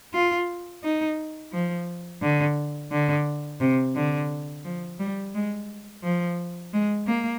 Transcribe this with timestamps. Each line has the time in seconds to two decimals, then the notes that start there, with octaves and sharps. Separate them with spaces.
0.14 F4
0.84 D#4
1.52 F3
2.22 D3
2.91 D3
3.61 C3
3.96 D3
4.65 F3
4.99 G3
5.35 G#3
6.04 F3
6.73 G#3
7.07 A#3